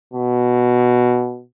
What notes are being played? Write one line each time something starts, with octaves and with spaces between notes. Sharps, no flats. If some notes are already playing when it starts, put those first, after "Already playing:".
B2